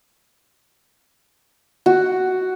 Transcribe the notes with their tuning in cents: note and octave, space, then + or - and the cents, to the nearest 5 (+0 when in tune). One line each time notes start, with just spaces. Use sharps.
F#4 +5